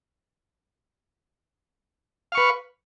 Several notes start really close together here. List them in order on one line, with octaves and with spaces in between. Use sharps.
F5 C#6 B4